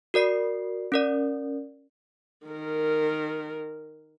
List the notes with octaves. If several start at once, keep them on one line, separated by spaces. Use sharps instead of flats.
F#4 A#4 D5 C7
C#4 A#4 D5
D#3 A#4